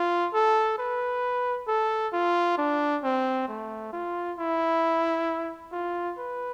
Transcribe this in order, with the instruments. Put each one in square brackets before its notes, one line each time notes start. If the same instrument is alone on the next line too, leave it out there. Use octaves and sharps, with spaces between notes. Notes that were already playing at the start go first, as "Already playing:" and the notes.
Already playing: [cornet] F4
A4
B4
A4
F4
D4
C4
A3
F4
E4
F4
B4